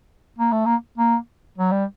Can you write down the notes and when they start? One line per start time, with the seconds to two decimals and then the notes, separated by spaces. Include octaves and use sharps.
0.39 A#3
0.52 A3
0.66 A#3
0.98 A#3
1.58 F#3
1.71 G3